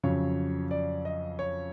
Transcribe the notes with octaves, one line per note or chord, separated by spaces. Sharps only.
F2 C#3 F#3 C#5
D5
D#5
C#5